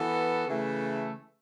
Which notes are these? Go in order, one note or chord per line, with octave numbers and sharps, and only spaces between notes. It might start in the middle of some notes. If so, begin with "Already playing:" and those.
Already playing: E3 B3 F#4 A4
C#3 E3 A3